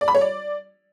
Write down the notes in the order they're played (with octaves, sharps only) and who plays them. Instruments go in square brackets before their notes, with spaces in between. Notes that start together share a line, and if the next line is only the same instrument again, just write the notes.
[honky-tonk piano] D5
B5
C#5
D5